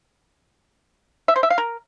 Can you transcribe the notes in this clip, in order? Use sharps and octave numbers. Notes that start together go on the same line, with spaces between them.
E5
C5
E5
F5
A#4